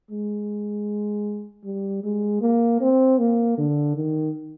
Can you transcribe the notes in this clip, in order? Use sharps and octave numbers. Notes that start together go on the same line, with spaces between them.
G#3
G3
G#3
A#3
C4
A#3
D3
D#3